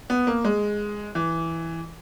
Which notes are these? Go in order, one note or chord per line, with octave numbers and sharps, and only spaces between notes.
B3
A#3
G#3
E3